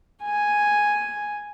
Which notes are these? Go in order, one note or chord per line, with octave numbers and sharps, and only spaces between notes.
G#5